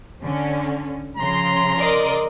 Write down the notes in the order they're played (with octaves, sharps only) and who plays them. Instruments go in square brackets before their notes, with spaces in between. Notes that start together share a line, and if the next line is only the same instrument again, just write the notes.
[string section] D3 C#4
[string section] C#3 F3 C6 [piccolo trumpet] A#5
[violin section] A#4 D5 D#5